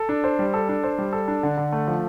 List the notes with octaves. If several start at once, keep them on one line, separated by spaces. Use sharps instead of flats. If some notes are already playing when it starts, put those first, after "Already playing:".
Already playing: A4
D4
C5
G3
A4
D4
C5
G3
A4
D4
D3
D3
A3
F3